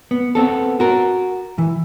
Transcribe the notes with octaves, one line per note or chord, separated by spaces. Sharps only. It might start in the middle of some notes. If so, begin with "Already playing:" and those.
B3
B3 C4 A4
F#4 A#4
E3